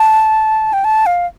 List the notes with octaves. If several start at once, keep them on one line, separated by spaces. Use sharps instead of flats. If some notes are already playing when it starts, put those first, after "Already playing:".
Already playing: A5
G5
A5
F5